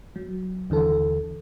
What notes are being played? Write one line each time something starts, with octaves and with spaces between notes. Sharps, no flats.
F#3
D#2 D3 E3 A4